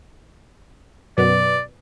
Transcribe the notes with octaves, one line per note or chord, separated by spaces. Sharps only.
F#2 B2 B3 D5